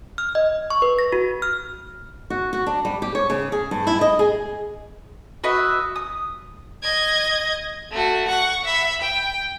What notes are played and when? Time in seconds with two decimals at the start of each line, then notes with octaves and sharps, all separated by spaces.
0.18 F6
0.35 D#5
0.70 C#6
0.82 B4
0.99 A#6
1.12 F#4
1.42 F6
2.30 F#4
2.53 F#4
2.67 D4
2.85 G3
3.02 G4
3.15 C#5
3.30 C#3
3.52 G#4
3.71 G2
3.87 E4
4.01 D#5
4.19 G#4
5.44 F#4 B4 D#5 E5
5.96 D#6
6.83 D#5 G#6
7.91 A3 F#4
8.28 F#5 C#6
8.65 E5 B5
9.01 G5